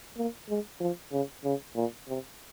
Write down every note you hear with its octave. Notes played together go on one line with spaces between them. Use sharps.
A#3
G#3
F3
C#3
C#3
A#2
C3